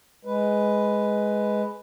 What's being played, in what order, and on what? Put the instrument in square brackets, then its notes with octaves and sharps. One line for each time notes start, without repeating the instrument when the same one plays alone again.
[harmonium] G#3 B4